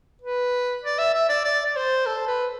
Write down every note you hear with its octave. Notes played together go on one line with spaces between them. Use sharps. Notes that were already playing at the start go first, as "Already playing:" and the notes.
B4
D5
E5
E5
D5
D5
D5
C5
A4
B4